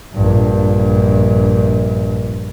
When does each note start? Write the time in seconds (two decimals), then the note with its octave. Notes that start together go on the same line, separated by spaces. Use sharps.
0.14 A#1 G2